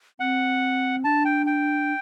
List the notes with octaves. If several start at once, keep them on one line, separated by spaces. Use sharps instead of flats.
C4 F#5
D4 A5
G5
G5